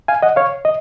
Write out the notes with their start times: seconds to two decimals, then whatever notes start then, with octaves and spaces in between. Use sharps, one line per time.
0.08 F5 G#5
0.22 D#5 F#5
0.36 C#5 F5
0.65 D#5